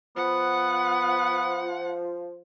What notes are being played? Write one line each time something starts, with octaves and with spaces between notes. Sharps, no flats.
F3 B3 F#5